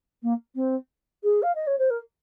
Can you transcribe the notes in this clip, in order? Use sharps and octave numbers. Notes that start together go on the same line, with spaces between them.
A#3
C4
G#4
F5
D#5
C#5
C5
A#4